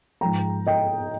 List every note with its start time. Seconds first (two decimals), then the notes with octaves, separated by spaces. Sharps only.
0.21 G#2 F3 G5 A#5
0.67 D#5 G5